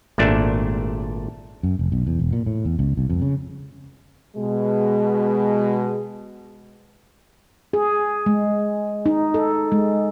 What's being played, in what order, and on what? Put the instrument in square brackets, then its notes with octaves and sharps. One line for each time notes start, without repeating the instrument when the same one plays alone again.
[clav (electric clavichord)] G#1 A#2 A3 D4 A5
[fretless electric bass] F#2
F1
B1
E2
E1
A#2
A2
E2
C#2
C2
F2
C#3
[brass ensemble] B2 G#3
[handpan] G#4
G#3
D#4
A4
G#3